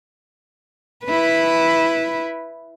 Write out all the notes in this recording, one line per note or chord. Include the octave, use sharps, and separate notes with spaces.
E4 B4